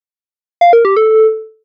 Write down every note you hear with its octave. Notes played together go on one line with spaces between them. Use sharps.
F5
A#4
G4
A4